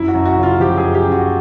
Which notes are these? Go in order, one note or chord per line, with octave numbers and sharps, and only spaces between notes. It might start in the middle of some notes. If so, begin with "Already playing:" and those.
Already playing: F#2 E4
F#4
F#2
F#4
C#3
F4
F3 G4
G#4
F#2
G4
F#2
F#4